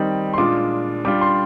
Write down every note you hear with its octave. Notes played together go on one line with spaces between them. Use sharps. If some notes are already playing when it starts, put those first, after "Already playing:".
Already playing: D#3 G3 C4 D#4
C6
A#2 G#3 D4 F4 D6
G3 D4 F4 D6
C6